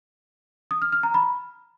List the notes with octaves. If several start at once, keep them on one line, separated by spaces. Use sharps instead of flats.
D#6
F6
F6
A#5
B5